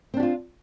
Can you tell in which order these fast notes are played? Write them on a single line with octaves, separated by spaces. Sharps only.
C4 D4 G4 F4